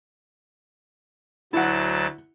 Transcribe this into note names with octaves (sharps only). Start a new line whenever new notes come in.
D2 F#3 E4 F#5 A5